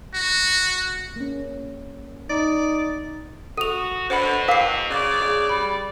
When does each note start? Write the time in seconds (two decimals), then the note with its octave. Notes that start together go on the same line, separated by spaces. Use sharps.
0.14 F#4
1.16 A#3 C#4
2.30 D#4 D5
3.57 F#4 A4 D#7 F7
4.10 B2 D3 C5 F#5 B5
4.48 E2 A#4 F5 G5 D6 C7
4.90 C#3 D5
5.21 G#4
5.49 G3 B5